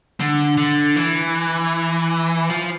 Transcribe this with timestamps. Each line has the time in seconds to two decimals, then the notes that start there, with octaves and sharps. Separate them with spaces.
0.20 D3
0.57 D3
0.96 E3
2.50 F3